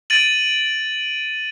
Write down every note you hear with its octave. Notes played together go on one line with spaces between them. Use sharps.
A6 D7 D#7 F#7